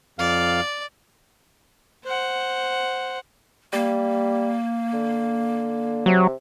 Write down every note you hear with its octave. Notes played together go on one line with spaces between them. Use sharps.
F2 D5 F5
C5 F#5
G3 A#3
D3
C3 F#3